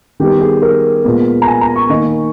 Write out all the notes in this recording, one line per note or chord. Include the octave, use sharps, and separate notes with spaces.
D#3 G3 B3 G4
G#4
A#4
A#2 G#3 B3
A#5
G#5
A#5
C#6
D#3 A#3 D#4